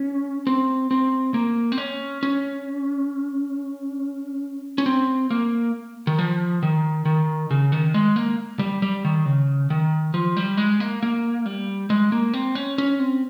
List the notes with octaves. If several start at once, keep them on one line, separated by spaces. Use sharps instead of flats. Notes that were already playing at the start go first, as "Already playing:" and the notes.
Already playing: C#4
C4
C4
A#3
C4
C#4
C#4
C#4
C4
A#3
D#3
F3
D#3
D#3
C#3
D#3
G#3
A#3
G3
G3
D#3
C#3
D#3
F3
G3
G#3
A#3
A#3
G3
G#3
A#3
C4
C#4
C#4
C4